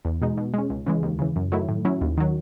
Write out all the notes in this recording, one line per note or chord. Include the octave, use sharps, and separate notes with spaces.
E2
B2 G#3 D#4
B2
G#3 C#4
C#2
C#3 E3 G#3
D#2
C#3 E3
F#2
D#3 F#3 A3 E4
A2
F#3 C#4 E4
D#2
D#3 F#3